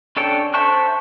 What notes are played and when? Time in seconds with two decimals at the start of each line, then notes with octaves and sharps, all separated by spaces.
0.17 C#4 D4 A4 C#5 G5
0.54 C5 E5 A5 C#6 F#6